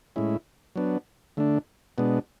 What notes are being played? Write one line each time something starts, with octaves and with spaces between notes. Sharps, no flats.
A2 G#3 C#4 E4
F#3 B3 D4
D3 A3 D4
B2 G#3 B3 D4